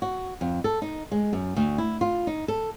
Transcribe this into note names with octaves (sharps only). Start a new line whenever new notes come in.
F#4
F2
A4
D#4
G#3
F#2
D2
E4
F4
D#4
A4